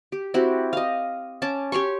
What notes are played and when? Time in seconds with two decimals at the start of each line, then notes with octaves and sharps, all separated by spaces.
0.12 G4
0.34 C4 E4 F#4 G4
0.73 D#5 F5
1.42 C#4 A5 D6
1.72 G4 C#5 C6 C#6